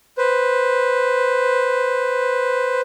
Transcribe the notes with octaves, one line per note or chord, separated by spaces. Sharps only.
B4 C5